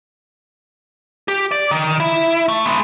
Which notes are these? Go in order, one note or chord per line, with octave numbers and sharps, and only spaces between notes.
G4
D5
D#3
E4
A3
G#3 B3